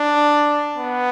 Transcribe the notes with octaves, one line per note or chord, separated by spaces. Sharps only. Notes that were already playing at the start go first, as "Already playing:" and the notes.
Already playing: D4
B3